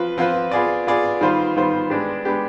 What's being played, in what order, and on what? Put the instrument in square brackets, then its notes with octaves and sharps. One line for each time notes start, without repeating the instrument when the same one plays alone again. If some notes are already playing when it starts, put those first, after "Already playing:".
Already playing: [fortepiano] F3 C4 F4 B4
F3 C4 F4 B4
B3 F4 G#4 D5
B3 F4 G#4 D5
D#3 G3 B3 F4 C5
D#3 G3 B3 F4 C5
G#3 B3 D4 G4
G#3 B3 D4 G4